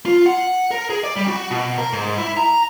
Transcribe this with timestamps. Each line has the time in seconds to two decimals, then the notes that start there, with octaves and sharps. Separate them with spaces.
0.06 F4
0.26 F#5
0.71 A#4
0.90 G#4
1.04 D5
1.16 G3
1.28 F#4
1.51 B2
1.78 A#4
1.93 G#2
2.18 E4
2.37 A#5